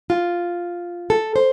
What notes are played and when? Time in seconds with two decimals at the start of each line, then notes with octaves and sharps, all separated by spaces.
0.10 F4
1.10 A4
1.36 C5